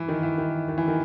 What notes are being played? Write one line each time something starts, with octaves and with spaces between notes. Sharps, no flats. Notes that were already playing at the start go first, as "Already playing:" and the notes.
Already playing: E3
D#3
E3
D#3
D#3
E3
D#3